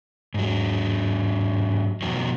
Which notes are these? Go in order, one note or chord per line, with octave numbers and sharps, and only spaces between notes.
G#2 F#3
F2 B2 D#3 F#3